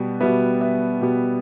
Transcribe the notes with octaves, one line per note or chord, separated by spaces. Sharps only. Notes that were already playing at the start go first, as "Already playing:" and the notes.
Already playing: B2 G3 B3 G5
B2 G3 B3 B4 E5
B4 E5
B2 G3 B3